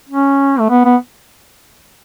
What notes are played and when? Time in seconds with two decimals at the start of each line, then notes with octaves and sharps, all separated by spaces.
0.09 C#4
0.59 A3
0.70 B3
0.85 B3